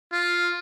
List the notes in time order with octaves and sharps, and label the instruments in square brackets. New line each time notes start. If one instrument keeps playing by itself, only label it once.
[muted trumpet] F4